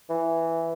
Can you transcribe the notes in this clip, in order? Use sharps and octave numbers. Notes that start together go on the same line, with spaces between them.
E3